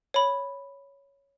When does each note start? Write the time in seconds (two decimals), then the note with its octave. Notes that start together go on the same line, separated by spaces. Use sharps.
0.14 C#5 B5